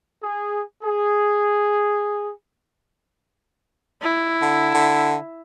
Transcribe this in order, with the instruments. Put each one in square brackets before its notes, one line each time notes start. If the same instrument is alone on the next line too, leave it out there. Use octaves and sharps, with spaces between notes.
[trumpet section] G#4
G#4
[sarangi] E4
[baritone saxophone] D3
D3